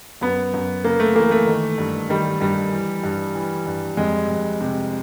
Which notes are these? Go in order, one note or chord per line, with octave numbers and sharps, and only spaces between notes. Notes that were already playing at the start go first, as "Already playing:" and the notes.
F#2 B3
F#2
C#3 A#3
A3
E3 A#3
A3
D#3
G2
D#3 G3
G2 G3
E3
G2
E3
G2
F2 G#3
F2
C3